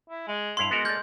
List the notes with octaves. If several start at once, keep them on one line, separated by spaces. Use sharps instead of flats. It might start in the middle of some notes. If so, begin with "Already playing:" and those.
E4
G#3
G2 E4 F5 C6
G#3 B3 F#4 A#4
A#3 A4 D5 G6